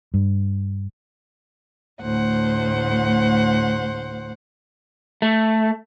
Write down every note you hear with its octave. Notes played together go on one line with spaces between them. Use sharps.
G2
D2 A2 C5 F#5
A3